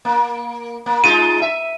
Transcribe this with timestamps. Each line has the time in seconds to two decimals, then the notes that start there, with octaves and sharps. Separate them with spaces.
0.05 A#3
0.86 A#3
1.04 G#3 D#4 F4 D#7
1.42 E5